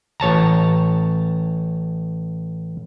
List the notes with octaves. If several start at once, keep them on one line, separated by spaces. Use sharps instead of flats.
A1 C#5 A5 A#5